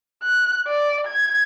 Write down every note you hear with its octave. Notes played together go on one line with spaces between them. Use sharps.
F#6
D5
G#6